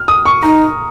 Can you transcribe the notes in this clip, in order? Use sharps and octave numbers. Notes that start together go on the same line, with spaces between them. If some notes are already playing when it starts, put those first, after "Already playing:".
Already playing: F6
D#6
C#6
D#4 A#5